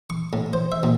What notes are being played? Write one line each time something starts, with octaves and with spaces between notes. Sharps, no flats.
C#6
A2
C5
E5
A#2